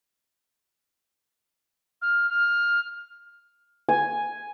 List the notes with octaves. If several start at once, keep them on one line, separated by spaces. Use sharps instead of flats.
F6
F6
G#5